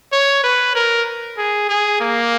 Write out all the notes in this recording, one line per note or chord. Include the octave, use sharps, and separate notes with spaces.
C#5
B4
A#4
G#4
G#4
A#3